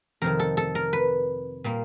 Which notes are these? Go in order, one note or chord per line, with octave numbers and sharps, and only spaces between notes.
F2 C3 D#3 A#4
A4
A4
A#4
B4
A#2 G3 A#3